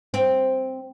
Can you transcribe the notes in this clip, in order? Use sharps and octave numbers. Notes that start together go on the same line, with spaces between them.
C4